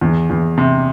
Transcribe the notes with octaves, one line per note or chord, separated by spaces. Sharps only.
E2
E2
C3